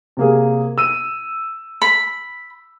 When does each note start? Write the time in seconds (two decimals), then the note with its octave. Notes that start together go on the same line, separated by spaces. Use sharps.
0.17 C3 A#3 G#4
0.78 E6 D#7
1.81 B5